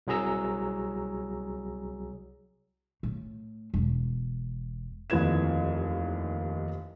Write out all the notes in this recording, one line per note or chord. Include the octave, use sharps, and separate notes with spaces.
C2 F#3 G#4 A#5 E6
A2
E1
F1 D#2 E3 B4 G#6 E7